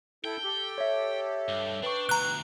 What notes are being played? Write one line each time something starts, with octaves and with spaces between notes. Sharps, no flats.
E4 A4 G5
G4 A4
C#5 E5
G2
D4 B4 D5 G5 C#6
D2 B2 A#5 F#6